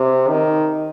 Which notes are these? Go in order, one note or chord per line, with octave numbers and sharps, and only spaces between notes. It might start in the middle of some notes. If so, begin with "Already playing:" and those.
Already playing: C3
D#3